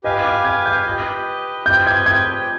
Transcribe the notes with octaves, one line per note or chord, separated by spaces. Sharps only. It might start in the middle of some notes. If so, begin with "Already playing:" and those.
G4 B4 D#5 F5 G#5
D6
G#6
G6
G4 B4 D#5
C4 G4 B4 D#5 G5 G6
G#6
G#6